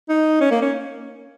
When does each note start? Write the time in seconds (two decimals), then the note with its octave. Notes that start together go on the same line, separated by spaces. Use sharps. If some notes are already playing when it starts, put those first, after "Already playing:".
0.09 D#4
0.41 C#4
0.51 A#3
0.62 C#4